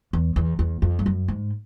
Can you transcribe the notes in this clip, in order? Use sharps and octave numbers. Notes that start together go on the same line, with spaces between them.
E2
E2
E2
F2
G2
F#2
G#2